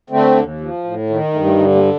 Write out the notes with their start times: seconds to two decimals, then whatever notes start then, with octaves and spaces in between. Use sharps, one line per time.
0.10 D3 A3 C4
0.36 D#2
0.61 F3
0.84 A2
1.09 D#3 A3
1.33 G2 A3
1.46 A3
1.59 D3 A3
1.75 G3 A#3